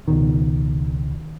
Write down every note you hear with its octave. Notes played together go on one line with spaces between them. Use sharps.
C#2 B2 D#3